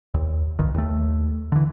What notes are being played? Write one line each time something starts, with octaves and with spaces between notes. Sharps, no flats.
D#2
C2 G2 D#3
D#2 A3
D3 E3